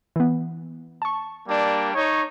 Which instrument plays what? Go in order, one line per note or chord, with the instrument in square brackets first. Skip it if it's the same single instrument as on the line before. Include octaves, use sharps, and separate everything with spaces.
[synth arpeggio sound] E3 B3
A5 C#6
[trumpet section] G3 A#3 D4
D#4 C#5